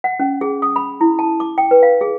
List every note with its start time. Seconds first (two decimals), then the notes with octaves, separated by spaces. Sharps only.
0.04 F#5
0.20 C#4
0.41 G#4
0.62 D#6
0.76 B5
1.01 E4
1.19 A5
1.40 D6
1.58 G5
1.71 B4
1.83 F5
2.01 G#4